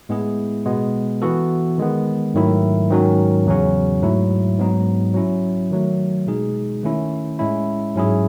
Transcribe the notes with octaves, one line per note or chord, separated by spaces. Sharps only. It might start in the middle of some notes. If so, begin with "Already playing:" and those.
A2 G#3 B3 E4 G#4
B2 G#3 B3
E3 B3 F#4 A4
D#3 G#3 B3
G#2 D#3 F#3 A3 E4
G#2 D#3 F#3 C#4 F#4
E2 C#3 F#3 C#4 F#4
G#2 F#3 A3 E4
G#2 F#3 B3 D#4
F#3 C#4 E4
D#3 F#3 A3
B2 G#3 D#4 G#4
D#3 A3 C#4 E4
A2 G#3 C#4 E4
G#2 F#3 C#4 E4 G#4